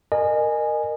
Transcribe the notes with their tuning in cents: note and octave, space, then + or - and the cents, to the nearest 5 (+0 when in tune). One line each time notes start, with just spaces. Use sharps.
A#4 -5 D#5 -30 G#5 +0